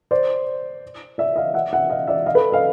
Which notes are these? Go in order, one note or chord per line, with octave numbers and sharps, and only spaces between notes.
C5 D5
D5 E5
D#5 F5
E5 F#5
E5 F#5
D#5 F5
D5 E5
D#5 F5
A4 B4
D#5 F5